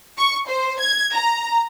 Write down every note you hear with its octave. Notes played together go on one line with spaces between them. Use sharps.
C#6
C5
G#6
A#5